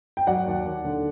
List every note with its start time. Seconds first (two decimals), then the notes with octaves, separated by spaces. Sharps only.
0.17 G5
0.27 F#3 D5 F#5
0.46 D#2
0.65 D#2
0.85 D3